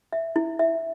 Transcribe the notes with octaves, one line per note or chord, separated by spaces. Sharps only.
E5
E4
E5